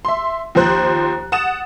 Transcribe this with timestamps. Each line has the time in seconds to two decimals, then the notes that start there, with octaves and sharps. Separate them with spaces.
0.05 E5 C6
0.55 D#2 F3 C5 F#6
1.32 F#5 D#6 A6 E7